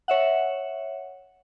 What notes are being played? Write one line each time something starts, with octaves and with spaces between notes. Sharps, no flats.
C#5 E5 F#5